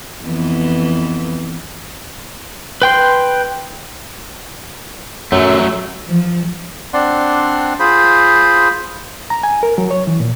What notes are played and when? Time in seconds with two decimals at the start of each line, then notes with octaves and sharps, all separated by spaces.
0.23 F2 E3 B3
2.82 B4 G5 C6
5.32 F#2 F#3 A3
6.08 F3
6.93 C4 D4 D5 F#5 C6
7.79 F4 G#4 C5 B5
9.30 A#5
9.43 G#5
9.63 A#4
9.78 F#3
9.91 C#5
10.07 E3
10.20 A#2